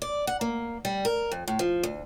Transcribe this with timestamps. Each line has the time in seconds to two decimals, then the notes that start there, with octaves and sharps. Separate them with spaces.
0.02 D5
0.27 F#5
0.41 A#3
0.85 G3
1.05 A#4
1.32 F2
1.48 A2
1.59 F3
1.83 D2